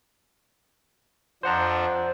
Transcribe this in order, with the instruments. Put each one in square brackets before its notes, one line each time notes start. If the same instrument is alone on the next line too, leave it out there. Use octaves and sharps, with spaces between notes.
[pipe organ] F2 F3 D4 [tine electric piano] C5 F#5 A#5